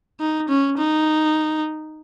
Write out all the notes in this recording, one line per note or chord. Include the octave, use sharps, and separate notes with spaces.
D#4
C#4
D#4